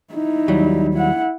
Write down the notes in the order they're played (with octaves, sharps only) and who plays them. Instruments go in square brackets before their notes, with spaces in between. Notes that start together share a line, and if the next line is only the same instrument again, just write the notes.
[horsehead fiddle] D#4 E4
[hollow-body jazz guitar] D#2 F#3 G3
[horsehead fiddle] E4 F#5